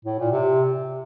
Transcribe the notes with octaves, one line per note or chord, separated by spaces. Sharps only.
A2
A#2
C3